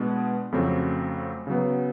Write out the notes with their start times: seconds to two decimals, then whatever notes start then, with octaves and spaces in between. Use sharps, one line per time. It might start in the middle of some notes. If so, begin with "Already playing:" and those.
Already playing: B2 G#3 B3 D4
0.52 F2 C#3 F#3 A3 C4
1.47 C#3 F#3 B3